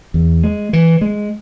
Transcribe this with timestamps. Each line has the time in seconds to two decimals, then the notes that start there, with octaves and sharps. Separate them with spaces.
0.14 E2
0.44 G#3
0.73 E3
1.01 G#3